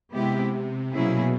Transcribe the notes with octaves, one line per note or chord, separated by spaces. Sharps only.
C3 G#3 B3 E4 G4
B2 F#3 A#3 C#4 E4 G#4